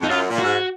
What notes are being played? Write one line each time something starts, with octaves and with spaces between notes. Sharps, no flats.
F2 D#4
F#2 F4
A#2
G#2 F#4